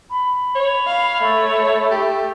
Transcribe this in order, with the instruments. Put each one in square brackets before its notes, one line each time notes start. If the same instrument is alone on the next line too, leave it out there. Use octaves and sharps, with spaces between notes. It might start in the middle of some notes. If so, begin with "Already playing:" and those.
[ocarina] B5
[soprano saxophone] C#5
[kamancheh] F5
A3
[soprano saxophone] G4